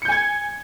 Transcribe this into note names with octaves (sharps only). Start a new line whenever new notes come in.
G#5 G6 G#6 C#7